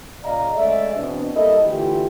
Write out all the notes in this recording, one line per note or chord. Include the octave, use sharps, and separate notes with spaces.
A#2 C#3 D5 D#5 F5 A#5
G#3 A3 C#4 D5 E5
B2 E3 B3 C4 D4
G3 A#3 E4 A4 D#5
D3 E3 A3 E4 F4 G4